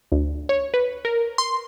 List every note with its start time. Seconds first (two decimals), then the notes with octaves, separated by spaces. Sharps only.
0.12 D2
0.49 C#5
0.74 B4
1.05 A#4
1.38 C6